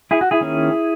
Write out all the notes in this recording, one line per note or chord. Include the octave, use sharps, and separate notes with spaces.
E4 G#4
F#4
E4 G#4
D#3 A#3 C#4